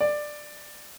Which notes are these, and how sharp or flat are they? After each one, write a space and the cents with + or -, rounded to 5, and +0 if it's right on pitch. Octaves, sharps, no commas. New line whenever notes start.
D5 +15